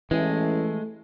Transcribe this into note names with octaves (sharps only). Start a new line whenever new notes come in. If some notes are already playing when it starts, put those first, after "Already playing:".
A1 E3 G#3 A3